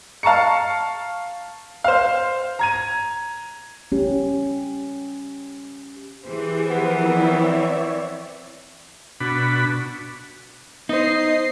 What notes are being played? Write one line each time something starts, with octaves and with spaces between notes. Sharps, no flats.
F5 A5 A#5 C#6 C#7
C5 F5
A#5 G#6 D#7
C#4 G4
E3 G4 G#4 C5
F3 B3 A#4
C4 C#5 D5 E5
B2 D4 F#4 B5
B3 D#4 C5 D#5 C7